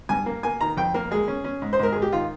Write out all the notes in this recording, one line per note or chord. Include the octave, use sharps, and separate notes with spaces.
G2 G#5
A#3
A#3 G#5
D#3 A#5
F2 G5
A#3 A#4
G#3 G#4
C#4
C#4
G#2
C5
G#2 A#4
G#2 G#4
G4
D#3 F4